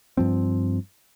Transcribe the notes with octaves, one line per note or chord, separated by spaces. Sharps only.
G2 F3 C4